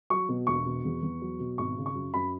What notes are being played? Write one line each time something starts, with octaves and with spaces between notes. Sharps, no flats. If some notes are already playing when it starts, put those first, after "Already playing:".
F#3 C#6
B2
E1 C#6
B2
E2
E2
F#3
B2
G#1 C#6
C#3
C#6
F#2
F#2 B5